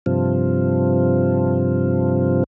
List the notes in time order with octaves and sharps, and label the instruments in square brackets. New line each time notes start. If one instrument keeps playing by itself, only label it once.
[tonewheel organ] G2 C3 F3